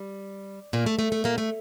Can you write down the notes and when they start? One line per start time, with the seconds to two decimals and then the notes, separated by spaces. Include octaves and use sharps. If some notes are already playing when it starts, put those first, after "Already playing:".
Already playing: G3
0.73 A#2 A#3
0.86 A3
0.99 A3
1.12 A3
1.24 A#2 A#3
1.38 A3